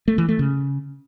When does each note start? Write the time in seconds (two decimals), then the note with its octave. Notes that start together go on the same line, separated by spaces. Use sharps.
0.08 A3
0.18 E3
0.29 A3
0.39 C#3